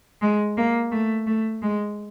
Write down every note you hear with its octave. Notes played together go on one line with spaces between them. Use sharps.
G#3
A#3
A3
A3
G#3